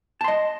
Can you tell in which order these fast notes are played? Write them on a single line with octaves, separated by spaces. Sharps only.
A5 C6 D#5